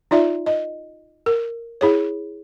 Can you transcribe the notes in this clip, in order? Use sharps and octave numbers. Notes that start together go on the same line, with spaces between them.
D#4 F4 D5 E5
D#5
A#4
E4 G#4 C#5